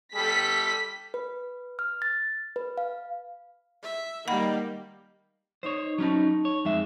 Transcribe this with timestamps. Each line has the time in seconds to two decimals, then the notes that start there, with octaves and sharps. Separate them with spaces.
0.15 G3 A4 B6
1.14 B4
1.79 F6
2.02 A6
2.56 B4
2.78 F5
3.83 E5
4.28 D#3 G3 A#3 F#5 B5
5.63 C4 D#4 C5 C#5
5.98 F#3 C#4 D#4 A5 B5 C#6
6.45 C#5
6.65 F2 G#3 E5